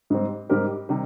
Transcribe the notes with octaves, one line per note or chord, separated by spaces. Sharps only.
G#2 G3 C4
G#2 G3 C4 G4 A#4
C3 D#3 G3